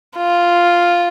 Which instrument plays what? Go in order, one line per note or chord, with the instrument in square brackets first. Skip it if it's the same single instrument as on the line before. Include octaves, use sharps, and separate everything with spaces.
[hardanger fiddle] F4